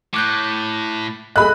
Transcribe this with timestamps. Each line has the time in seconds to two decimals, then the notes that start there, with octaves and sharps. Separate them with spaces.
0.14 A2 D6 F#6 G6
1.36 G#4 A4 D#5 B5 F#6